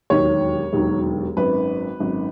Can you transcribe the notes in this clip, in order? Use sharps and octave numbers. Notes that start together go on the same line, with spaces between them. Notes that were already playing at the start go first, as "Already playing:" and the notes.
E1 D#2 D#3 F#3 C#5
E1 D#2 D#3 F#3
G#1 F#2 D#3 B4
G#1 F#2 D#3